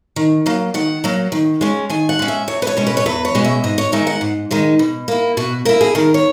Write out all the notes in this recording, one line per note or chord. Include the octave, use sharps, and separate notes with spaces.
D#3
F#3 A#3
D#3 F#5
F#3 A#3
D#3
G#3 C#4
D#3 G#5
F#5
G#3 C#4
E5
E2 C#5
B4
C#5
B2 G#3 C#4
B4
C#5
E2 B4
C#5
B2 G#3 C#4
E5
G#2 D#5
C#5
D#3 G#3 D#4 E5
F#5
G#2
D#3 G#3 D#4
B2
A#3 E4
B2 F#4
A#3 E4 A#4
G#4
D#3 A#4
C#5